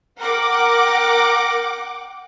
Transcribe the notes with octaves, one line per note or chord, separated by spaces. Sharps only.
A#4 F#5 G5 D6